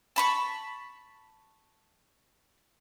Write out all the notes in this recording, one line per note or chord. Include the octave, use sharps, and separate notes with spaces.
A5 B5 C#6